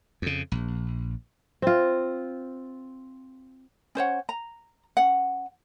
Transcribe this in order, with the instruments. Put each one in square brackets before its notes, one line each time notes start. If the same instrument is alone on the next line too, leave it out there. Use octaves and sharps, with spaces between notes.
[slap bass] F2 C#3
A#1
[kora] C4 F4
[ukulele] C#4 C5 C#5 F#5
A#5
C#4 F#5